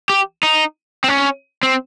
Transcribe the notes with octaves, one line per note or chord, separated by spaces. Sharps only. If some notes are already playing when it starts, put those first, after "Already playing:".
G4
D#4
C4
C#4
C4